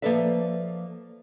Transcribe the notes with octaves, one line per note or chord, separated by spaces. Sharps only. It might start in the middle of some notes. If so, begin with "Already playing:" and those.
F3 A#3 A4 B4 D5 E5